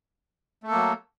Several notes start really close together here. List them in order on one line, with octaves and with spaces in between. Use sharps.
A3 A4 A#3 F#3